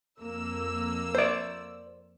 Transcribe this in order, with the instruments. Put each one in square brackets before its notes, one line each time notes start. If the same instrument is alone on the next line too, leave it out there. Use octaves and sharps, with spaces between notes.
[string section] F2 A#3 E6
[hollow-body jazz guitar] C5 D5